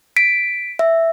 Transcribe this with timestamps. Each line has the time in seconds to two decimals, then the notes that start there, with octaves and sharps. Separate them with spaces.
0.16 B6 D7
0.79 E5